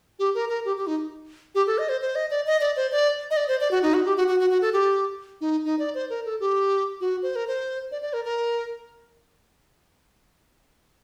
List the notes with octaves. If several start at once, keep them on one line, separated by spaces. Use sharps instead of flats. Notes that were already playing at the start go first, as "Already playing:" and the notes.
G4
A#4
A#4
G4
G4
D#4
G4
A4
D#5
C5
C5
D#5
D5
D#5
D5
C5
D5
D#5
D5
C5
D5
F#4
D#4
F#4
G4
F#4
F#4
F#4
F#4
A4
G4
D#4
D#4
D5
C5
A#4
A4
G4
F#4
C5
A#4
C5
D5
D5
A#4
A#4